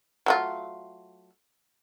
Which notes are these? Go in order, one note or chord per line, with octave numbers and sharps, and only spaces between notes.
F#3 A3 F4